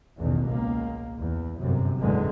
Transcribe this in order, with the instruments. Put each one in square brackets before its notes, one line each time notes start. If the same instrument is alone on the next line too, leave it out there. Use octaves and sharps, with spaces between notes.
[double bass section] A1 E2 B2 D#3
C#2 A#3
E2
G1 F#2 C3
F#1 E2 A2 D3 G#3